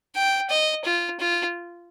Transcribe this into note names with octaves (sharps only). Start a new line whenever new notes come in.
G5
D#5
F4
F4